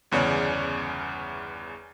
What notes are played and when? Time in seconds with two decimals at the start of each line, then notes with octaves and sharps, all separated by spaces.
0.11 G1 E2 C#3 C#5 D5